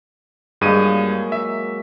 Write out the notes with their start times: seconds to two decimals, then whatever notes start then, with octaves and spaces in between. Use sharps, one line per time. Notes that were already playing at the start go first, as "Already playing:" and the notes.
0.61 G2 F#3 G#3 A#3 G#4 D#7
1.32 E5